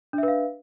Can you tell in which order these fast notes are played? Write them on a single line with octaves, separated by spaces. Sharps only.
D4 E5 B4 F5